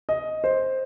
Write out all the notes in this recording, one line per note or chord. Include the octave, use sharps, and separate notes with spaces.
D#5
C5